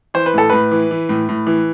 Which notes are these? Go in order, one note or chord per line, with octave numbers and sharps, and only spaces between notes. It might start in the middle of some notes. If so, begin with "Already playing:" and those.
E3 C5
B4
A2 A4
A2 B4
E3
E3
A2
A2
E3